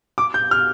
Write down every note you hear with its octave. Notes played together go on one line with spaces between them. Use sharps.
D6
G6
F6